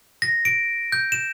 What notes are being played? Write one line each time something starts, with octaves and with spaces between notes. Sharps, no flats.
A#6
D7
G6
E7